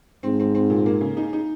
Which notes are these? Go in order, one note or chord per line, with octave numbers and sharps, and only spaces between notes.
G#2 C4
C4
C4
A#2
A#3
C#3
D#4
D#4